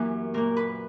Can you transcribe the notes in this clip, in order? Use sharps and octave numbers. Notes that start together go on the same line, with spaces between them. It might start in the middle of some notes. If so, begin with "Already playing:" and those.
Already playing: F#2 E3 A#3 G4 A#4
A#2 A#3 A#4
B4